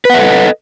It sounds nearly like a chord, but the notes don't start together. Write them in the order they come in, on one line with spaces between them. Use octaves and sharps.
B4 F#5 E5 A4 D#5